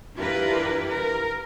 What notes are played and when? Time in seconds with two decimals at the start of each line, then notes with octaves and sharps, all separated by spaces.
0.18 D4 E4 F4 G4 A#4 B4
0.90 A#4